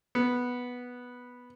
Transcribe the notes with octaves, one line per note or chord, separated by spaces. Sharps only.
B3